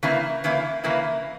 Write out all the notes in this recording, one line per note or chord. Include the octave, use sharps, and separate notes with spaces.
C#3 E3 A#3 E4
C#3 E3 A#3 E4
C#3 E3 A#3 E4